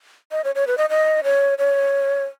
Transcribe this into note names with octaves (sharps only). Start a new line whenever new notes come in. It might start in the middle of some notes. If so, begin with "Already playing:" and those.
D#5
C#5
C#5
B4
D#5
D#5
C#5
C#5